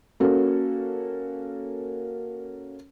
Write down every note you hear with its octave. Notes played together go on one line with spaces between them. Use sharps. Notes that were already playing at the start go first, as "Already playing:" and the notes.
A#3 C#4 F#4 A4